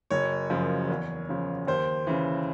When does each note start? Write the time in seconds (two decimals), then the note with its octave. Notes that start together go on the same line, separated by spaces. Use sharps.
0.11 F#1 C#5
0.50 F#2 C#3 F3
0.89 E2
1.29 C#3 F3
1.67 D#2 C5
2.07 C#3 E3